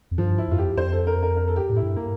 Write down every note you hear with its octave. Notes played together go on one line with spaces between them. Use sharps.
F2
G2 F3
E4
F2 F4
G4
F2 C5
A4
A#4
A#4
A#4
A4
G4
A2
E4
G2
A#3